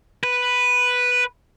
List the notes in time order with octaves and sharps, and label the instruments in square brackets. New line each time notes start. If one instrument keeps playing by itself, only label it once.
[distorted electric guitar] B4